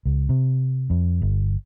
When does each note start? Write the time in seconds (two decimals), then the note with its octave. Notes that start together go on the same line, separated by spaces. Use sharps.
0.05 C#2
0.29 C3
0.90 F2
1.22 G1